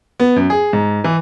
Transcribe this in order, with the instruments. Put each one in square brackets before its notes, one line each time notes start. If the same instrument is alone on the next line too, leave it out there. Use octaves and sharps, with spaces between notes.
[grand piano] B3
F#2
G#4
G#2
E3